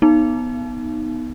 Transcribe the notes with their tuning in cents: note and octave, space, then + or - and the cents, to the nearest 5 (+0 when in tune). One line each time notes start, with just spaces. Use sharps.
B3 +0 D#4 +0